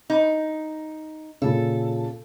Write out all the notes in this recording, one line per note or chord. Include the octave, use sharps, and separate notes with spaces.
D#4
A#2 C#3 A4